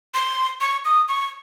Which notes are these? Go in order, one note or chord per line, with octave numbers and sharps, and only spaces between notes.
C6
C#6
D#6
C#6